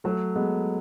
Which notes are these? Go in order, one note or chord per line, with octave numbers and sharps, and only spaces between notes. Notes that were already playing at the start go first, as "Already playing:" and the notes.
F#3 A3
G#3 B3